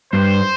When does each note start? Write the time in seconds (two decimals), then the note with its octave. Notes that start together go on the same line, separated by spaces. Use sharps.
0.13 G2 C5